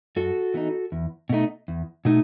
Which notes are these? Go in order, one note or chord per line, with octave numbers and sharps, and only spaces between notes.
F#2 F#4 A4
E3 B3 D#4
E2
B2 A3 D#4
E2
B2 A3 D#4